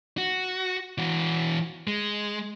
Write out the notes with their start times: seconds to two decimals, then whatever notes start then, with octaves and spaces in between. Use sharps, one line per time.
0.18 F#4
0.98 E3 F#4
1.87 G#3